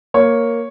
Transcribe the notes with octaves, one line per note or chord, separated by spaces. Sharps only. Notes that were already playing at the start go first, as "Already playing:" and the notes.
A#3 C#5